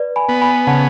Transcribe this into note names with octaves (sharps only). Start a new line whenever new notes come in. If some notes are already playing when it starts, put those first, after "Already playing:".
Already playing: B4 D5
G#5 B5
B3
G#5 B5
C#3 F#5 A5